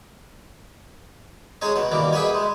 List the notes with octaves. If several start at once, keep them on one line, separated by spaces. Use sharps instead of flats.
G#3 D#4 G#4 C#5 D#5
B2 F#5
B2 D#3 E3 G3 A#3
G4 G#4 B4 E5 F#5 G#5
G#3